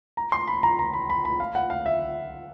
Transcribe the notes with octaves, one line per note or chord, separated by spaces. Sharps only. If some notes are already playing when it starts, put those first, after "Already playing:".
A#5
C6
B5
A#5
A#5
B5
B5
B5
F5
F#5
F5
E5